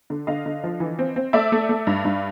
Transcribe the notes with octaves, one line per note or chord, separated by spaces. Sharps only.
D3
D3 D#5 F5
D3
F3
E3
C4
C4
A3 D5 E5
A3
A3
G2
G2